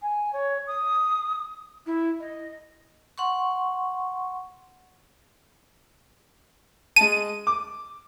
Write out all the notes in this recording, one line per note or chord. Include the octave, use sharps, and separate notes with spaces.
G#5
C#5
D#6
E4
D#5
F#5 C6 C#6
G#3 A5 D#7
D6